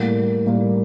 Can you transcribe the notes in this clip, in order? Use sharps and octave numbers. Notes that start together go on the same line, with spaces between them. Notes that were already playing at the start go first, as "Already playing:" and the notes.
Already playing: A2 G3 A#3
A2 G3 A#3